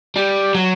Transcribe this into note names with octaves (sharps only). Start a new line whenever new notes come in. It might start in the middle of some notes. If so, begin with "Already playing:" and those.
G3
F#3